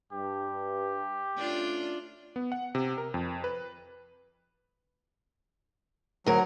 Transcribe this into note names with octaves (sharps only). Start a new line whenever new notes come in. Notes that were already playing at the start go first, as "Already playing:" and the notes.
G2 G4
A3 C#4 D4 F4
B3
F#5
C3
A#4
F2
B4
D2 F#3 A#4